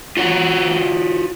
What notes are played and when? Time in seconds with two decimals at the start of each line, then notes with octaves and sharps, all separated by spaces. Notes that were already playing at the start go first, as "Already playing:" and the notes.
0.17 F4 F#4 C#5 F#5